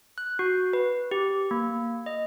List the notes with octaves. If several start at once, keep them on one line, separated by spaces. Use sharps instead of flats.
F#6
F#4
B4
G4
A#3
D#5